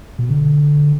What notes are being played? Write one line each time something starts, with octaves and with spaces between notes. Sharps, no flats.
B2
D3